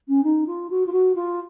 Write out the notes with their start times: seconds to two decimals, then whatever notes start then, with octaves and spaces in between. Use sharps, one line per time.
0.08 C#4
0.23 D#4
0.46 F4
0.70 F#4
0.86 F4
0.92 F#4
1.15 F4